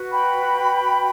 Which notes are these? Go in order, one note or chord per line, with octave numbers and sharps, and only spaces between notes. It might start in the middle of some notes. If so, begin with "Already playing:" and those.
Already playing: F#4 B4
G5 B5